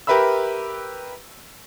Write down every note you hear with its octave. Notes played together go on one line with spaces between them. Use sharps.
G4 A#4 B4 E5 B5 E6